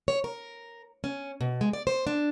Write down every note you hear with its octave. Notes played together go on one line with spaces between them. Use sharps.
C#5
A#4
C#4
B2
G#3
D5
C5
D4